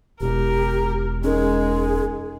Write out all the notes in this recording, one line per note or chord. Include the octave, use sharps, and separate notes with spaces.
E1 G4 A#4
G#3 C#4 D#4 G#4 A#4